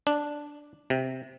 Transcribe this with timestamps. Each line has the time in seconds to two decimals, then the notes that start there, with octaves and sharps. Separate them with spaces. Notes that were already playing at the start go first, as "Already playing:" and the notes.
0.07 D4
0.90 C3